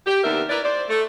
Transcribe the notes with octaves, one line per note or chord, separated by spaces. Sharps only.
G4
D#2 C3 B3 D4 A#4 E5
E4 A#4 B4 D5
C5 D5
A3